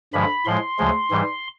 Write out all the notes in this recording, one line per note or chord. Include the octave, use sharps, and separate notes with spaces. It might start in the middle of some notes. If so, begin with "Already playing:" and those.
G2 D3 F3 G#3 B5
A2 F3 G#3 C6
D2 C#3 F3 G#3
G#2 E3 G3